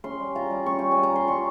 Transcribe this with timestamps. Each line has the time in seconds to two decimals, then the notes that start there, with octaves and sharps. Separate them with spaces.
0.04 C#4 C6
0.20 G3
0.35 F4 A#5
0.51 G3
0.66 C#4 C#6
0.79 G3 G5
0.91 G#5
0.97 F4
1.03 A#5
1.12 G3 C6
1.28 G3 C#6